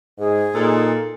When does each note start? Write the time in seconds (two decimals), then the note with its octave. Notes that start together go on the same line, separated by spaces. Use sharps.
0.18 G#2 G#4
0.54 A#2 D#4 A4